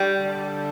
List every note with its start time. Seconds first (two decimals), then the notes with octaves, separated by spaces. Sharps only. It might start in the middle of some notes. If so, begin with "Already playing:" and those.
Already playing: G3
0.22 D3